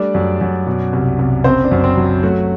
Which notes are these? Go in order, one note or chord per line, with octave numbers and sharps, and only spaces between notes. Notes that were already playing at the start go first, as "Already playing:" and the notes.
Already playing: G3 A3 D4 D5
F#2
F#2
B2
C2
C2
F#1 C4 C5
D4
F#2
C4
F#3
F#3 A3 F#4